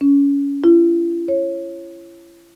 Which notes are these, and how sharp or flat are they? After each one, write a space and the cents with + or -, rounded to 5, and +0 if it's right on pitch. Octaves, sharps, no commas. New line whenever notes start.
C#4 +25
E4 +45
C#5 -25